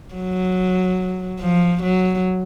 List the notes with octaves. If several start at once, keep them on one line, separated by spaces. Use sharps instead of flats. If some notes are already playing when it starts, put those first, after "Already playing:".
F#3
F3
F#3